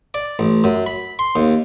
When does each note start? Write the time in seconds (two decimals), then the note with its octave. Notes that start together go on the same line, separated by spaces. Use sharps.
0.14 D5
0.39 A1
0.64 F#2
0.86 B5
1.19 C6
1.36 D#2